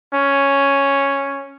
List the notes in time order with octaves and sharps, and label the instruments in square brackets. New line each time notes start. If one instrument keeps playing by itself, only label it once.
[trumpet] C#4